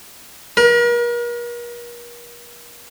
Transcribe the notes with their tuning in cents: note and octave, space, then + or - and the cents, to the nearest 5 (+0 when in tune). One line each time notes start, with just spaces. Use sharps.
A#4 +40